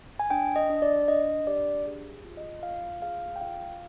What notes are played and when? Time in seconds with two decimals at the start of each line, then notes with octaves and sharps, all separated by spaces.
0.19 G#5
0.30 D4 G5
0.56 D#5
0.70 D4
0.82 D5
1.08 D4 D#5
1.47 G4 D5
1.86 G#4
2.25 F4
2.37 D#5
2.63 F4 F5
3.02 G#4 F5
3.36 G5
3.41 F4 F5